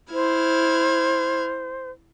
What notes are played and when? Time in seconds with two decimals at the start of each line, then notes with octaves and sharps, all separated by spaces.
0.13 E4 C5 F6 G#6